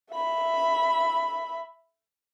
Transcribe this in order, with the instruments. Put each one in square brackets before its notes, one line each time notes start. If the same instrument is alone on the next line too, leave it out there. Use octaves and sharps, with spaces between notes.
[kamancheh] E5 B5